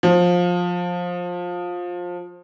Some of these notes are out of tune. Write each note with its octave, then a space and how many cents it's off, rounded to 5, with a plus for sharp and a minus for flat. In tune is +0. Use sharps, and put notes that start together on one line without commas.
F3 +20